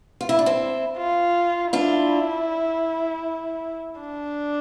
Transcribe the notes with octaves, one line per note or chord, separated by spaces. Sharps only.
F4
E4
D4
C4 E4
F4
D4 E4 F4
D4